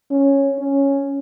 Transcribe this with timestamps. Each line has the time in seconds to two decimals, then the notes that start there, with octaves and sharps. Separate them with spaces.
0.11 C#4
0.59 C#4